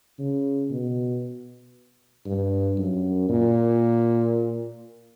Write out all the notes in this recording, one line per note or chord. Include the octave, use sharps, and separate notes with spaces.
C#3
B2
G2
F#2
A#2